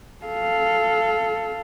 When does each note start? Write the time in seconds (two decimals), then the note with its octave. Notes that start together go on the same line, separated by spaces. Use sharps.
0.25 A4 F5